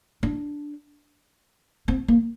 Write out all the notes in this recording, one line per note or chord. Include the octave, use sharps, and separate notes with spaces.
D4
C4
A#3